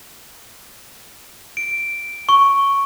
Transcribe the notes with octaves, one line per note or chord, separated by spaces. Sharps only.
D7
C#6